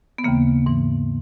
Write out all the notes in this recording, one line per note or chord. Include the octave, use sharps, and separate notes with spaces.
B3
D#2 C#3 E3 A#3
G#2 E3